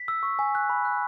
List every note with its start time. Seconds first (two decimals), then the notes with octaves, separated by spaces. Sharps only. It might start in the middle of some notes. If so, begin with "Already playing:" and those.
Already playing: B6
0.08 E6
0.23 C#6
0.39 G#5
0.55 F#6
0.70 B5
0.85 F#6